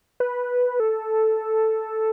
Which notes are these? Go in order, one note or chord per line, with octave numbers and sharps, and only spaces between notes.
B4
A4